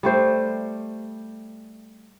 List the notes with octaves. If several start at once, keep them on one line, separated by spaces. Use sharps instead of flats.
G3 A3 C5